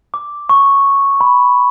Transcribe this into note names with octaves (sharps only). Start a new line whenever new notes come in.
D6
C#6
B5